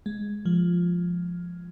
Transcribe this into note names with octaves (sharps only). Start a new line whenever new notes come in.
G#3
F3